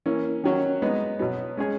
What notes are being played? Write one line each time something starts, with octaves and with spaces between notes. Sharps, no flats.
E3 A#3 C#4
D#3 F#3 C#4 F#4
G#3 B3 D#4
B2 F#3 B3
G#3 C#4 G#4 C#5